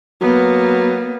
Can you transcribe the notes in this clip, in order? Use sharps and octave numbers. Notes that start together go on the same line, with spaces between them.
F#3 A#3 B3